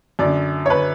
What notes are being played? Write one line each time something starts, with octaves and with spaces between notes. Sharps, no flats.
F#2 D3 D5
C#5
D3 B4